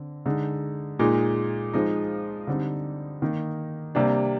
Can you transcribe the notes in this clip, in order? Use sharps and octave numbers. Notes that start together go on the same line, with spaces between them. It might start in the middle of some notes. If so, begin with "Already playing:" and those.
Already playing: D3 C4
D3 G#3 D#4
A#2 G#3 D#4
F3 G#3 D#4
D3 G3 C4 D#4
D#3 A#3 D#4
C3 G3 A#3 D4